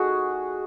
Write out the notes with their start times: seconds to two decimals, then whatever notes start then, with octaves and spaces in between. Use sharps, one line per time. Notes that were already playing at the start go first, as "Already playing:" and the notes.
Already playing: A3 D#4 F#4 G#4